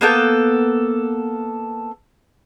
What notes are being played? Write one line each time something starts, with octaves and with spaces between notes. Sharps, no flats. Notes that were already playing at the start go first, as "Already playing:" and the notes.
A#3 B3 A4 G5